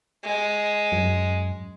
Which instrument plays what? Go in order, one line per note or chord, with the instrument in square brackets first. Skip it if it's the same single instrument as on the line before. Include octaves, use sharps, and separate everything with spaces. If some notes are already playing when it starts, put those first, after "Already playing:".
[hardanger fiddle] G#3
[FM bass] F#2